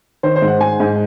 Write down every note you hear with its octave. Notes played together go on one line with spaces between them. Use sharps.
D#3 C5
C5
G#2
F#5
G#3 G#5
G#2